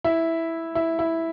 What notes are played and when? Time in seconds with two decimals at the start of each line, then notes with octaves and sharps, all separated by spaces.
0.04 E4
0.75 E4
0.99 E4